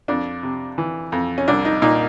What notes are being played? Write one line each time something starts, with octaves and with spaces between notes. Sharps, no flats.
F2 D4
C3
E3
F2
C#4
C2 D4
D#4
A#2 D#4